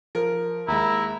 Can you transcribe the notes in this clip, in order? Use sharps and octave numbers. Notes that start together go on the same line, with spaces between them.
F3 A#4
D#2 G#3 E4 A#5